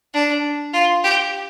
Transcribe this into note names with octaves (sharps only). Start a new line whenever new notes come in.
D4
F4
G4